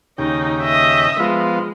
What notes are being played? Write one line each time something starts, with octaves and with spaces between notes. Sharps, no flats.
D#2 C#3 D#4 G5
D#5 E5
F3 G#3 B3 F4